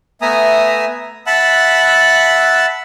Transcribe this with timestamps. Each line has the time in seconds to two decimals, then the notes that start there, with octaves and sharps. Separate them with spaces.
0.21 A3 B3 E5 G#5 A#5 D#6
1.26 E5 F#5 A5 B5 E6 F#6